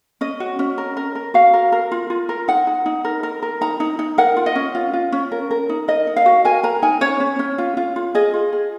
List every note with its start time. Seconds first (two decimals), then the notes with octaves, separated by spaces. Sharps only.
0.21 C#4 D#5
0.40 F#4
0.59 C#4
0.78 A#4
0.97 A#4
1.15 A#4
1.34 F#4 F5
1.53 A#4
1.72 A#4
1.92 F4
2.10 F4
2.29 A#4
2.48 D#4 F#5
2.67 D#4
2.86 D#4
3.05 A#4
3.23 A#4
3.43 A#4
3.61 D#4 A#5
3.80 D#4
3.99 D#4
4.18 A#4 F#5
4.37 F4
4.46 D#5
4.55 C#4
4.75 F4
4.93 F4
5.12 C#4
5.32 A#4
5.51 A#4
5.69 D#4
5.88 A#4 D#5
6.07 D#4
6.16 F5
6.26 F#4
6.45 A#4 G#5
6.63 A#4 A#5
6.82 D#4 G#5
7.01 C#4 C#5
7.20 C#4
7.39 C#4
7.58 F4
7.77 F4
7.96 F4
8.15 G#4 D#5
8.34 F4
8.53 G#4